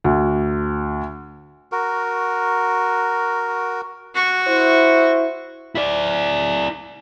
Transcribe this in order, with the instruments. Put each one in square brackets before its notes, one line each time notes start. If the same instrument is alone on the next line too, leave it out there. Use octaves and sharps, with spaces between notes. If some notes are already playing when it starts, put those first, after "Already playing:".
[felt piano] D2
[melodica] F#4 A#4
[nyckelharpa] F#4 C#6
[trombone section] E4 [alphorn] C5
[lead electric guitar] E4 D5